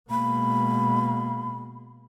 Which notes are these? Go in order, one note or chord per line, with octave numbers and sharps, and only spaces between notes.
B2 G#3 A#3 B5